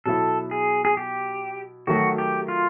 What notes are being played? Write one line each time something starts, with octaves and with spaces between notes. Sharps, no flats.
B2 F#3 B3 E4 A4
G#4
G#4
G4
D#3 F#3 A3 F#4
G4
F4